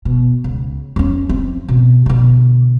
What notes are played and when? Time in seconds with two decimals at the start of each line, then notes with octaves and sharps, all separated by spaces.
0.05 B2
0.44 C#2
0.96 F2 C#4
1.29 F3 C4
1.68 B2
2.06 B2 D3